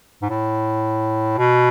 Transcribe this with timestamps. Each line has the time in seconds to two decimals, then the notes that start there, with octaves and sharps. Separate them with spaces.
0.22 G#2
0.30 A2
1.37 B2